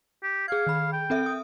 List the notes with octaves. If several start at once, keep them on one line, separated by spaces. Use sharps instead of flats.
G4
G#4 F5 G#6
D#3 B5
G5
C4 A4 E5
D#6